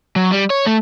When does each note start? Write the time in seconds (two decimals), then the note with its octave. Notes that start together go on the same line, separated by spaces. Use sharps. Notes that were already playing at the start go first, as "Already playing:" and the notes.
0.16 F#3
0.32 G3
0.50 C#5
0.66 A3